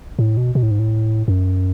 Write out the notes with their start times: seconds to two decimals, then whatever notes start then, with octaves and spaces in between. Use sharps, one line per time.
0.19 A2
0.37 B2
0.55 B2
0.63 A2
0.71 G#2
0.79 A2
1.28 F#2